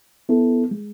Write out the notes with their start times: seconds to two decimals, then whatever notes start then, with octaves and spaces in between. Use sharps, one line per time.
0.29 B3 E4 A4
0.71 G#3